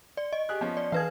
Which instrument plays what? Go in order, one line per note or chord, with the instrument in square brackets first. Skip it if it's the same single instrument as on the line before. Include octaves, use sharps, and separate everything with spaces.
[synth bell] D5
D#5
[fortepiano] G4 G#4 F#6
F3 B3 C#4
[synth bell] D5
[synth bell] E3 B4 G#6 [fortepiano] G#4 F5